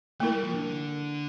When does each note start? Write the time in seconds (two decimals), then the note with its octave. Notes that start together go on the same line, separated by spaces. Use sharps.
0.20 A3 A#3 E4 A#4
0.32 G3
0.43 F3
0.54 D3